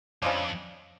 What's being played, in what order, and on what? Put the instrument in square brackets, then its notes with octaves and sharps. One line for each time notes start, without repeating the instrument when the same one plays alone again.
[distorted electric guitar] F2 [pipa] C#3 F3 G#3 D4